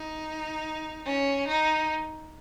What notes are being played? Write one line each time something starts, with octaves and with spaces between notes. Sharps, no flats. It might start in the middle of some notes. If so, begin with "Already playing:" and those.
Already playing: D#4
C#4
D#4